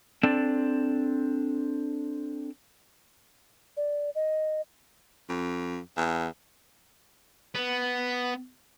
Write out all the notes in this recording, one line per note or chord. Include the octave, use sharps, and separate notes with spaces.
C4 D4 A4 D5
D5
D#5
F2
E2
B3